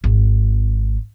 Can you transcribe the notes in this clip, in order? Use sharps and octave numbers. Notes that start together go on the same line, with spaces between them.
G#1 C4